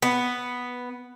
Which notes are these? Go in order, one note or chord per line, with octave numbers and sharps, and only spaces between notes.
B3